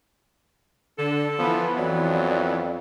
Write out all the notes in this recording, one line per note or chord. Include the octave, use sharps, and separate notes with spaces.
D3 D4 A4
E3 F3 B3 B5
F2 F#3 D5